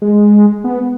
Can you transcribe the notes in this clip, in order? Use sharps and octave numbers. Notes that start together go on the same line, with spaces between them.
G#3
B3